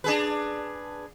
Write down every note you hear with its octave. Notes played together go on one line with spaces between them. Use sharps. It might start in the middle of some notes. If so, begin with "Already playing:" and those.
D4 G#4 B4